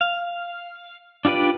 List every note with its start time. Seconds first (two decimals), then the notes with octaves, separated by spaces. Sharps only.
0.01 F5
1.25 D4 F4 G4 B4 D5